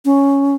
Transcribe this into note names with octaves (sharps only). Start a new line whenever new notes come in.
C#4